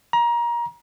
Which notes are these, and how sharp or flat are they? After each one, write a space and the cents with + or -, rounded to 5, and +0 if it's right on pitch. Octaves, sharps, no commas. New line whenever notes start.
A#5 +25